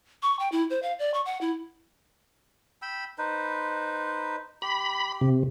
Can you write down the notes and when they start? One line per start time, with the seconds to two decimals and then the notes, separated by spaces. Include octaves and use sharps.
0.22 C#6
0.39 G5
0.52 E4
0.70 C5
0.83 F5
0.99 D5
1.14 C#6
1.26 F#5
1.41 E4
2.82 G5 B5 E6
3.18 D#4 B4 C5
4.62 G4 B5
5.21 C3